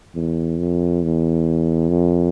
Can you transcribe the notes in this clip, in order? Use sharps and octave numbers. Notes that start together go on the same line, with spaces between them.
E2
F2
E2
F2